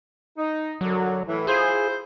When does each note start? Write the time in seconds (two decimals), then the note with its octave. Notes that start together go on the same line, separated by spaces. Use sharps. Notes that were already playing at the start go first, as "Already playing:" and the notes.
0.37 D#4
0.81 F#2 D3 F#3
1.26 A2 E3
1.47 E4 F4 G#4 C5